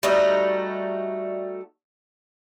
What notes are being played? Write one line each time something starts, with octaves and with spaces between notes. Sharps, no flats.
G3 A3 D#4 F#4